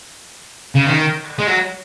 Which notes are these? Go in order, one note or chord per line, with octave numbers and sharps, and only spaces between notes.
C#3
D#3
G#3
F#3